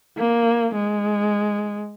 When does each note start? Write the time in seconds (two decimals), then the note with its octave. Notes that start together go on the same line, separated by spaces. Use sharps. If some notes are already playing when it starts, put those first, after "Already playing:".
0.18 A#3
0.75 G#3